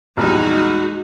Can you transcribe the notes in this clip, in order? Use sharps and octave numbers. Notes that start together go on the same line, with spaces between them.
A#1 E2 G3 G#3 D#4 F#4